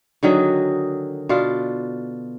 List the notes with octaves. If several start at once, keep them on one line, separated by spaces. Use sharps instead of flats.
D3 D#3 F#3 G#4
B2 D4 F4